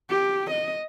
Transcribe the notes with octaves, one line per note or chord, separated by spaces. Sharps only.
G4
D#5